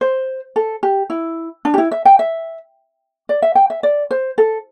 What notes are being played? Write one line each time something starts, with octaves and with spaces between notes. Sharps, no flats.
C5
A4
G4
E4
D4
G4
E4
E5
G5
E5
D5
E5
G5
E5
D5
C5
A4